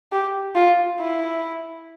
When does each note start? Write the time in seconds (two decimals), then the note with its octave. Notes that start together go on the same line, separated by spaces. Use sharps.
0.12 G4
0.55 F4
1.00 E4